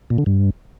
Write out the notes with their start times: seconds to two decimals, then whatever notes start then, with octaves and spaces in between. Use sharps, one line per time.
0.10 A#2
0.18 D3
0.26 G2